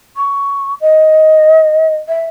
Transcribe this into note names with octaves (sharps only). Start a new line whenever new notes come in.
C#6
D#5
E5